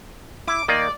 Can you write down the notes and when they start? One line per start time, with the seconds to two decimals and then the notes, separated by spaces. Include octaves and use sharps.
0.48 E4 D6
0.68 D#3 A#3 D5 D#5